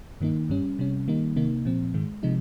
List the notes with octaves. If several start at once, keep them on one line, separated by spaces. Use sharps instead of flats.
G2 D#3 A#3 D#4
G2 G3 C#4
C3 G3 C#4
D#3 G3 A#3 D#4
C3 D#3 A#3 D#4
A#2 F3 C4
G#2 D#3 G#3
C3 F3 G#3 D#4